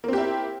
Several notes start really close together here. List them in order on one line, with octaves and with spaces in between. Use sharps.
A#3 C4 G4 E4